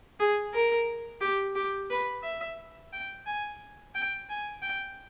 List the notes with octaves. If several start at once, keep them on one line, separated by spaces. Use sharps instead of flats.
G#4
A#4
G4
G4
B4
E5
G5
G#5
G5
G#5
G5